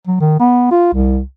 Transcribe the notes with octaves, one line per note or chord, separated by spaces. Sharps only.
F#3
D#3
B3
F4
C2